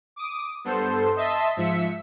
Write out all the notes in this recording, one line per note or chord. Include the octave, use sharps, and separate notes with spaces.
D6 D#6
G2 B3 A4 C5
D#5 E5 A5 C6 B6
G#2 F3 E5 B6 C#7